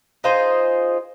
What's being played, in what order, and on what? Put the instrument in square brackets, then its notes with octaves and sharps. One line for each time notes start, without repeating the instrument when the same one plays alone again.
[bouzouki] D#4 F4 G#4 C5